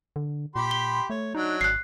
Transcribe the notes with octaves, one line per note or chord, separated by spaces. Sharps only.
D3
A#2 G4 B5 C6
G7
A3 C#5
F#3 D4 D#4
G#1 F#6 C7